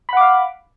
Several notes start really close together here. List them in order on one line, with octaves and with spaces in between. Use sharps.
B5 F#5 D6 F5